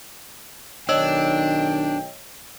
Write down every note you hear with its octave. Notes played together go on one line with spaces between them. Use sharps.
B1 D#3 D4 C#5 D#5 G5 E6